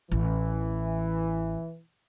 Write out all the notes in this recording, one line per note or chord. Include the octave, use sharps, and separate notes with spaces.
A1 E3